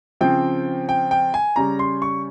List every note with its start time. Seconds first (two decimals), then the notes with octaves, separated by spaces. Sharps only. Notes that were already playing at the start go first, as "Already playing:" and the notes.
0.21 C#3 F3 C4 G5
0.89 G5
1.11 G5
1.34 G#5
1.56 C#3 G3 C#4 A#5
1.79 C6
2.02 C#6